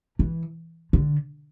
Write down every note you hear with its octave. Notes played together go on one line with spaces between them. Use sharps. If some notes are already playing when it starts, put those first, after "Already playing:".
E3
D3